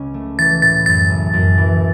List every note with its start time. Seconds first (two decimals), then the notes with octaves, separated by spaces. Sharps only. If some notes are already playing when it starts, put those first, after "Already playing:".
Already playing: C#2 C#4
0.14 A3
0.38 E3 A6
0.62 A2 A6
0.86 F#2 A6
1.10 F#1
1.33 F#2
1.58 E3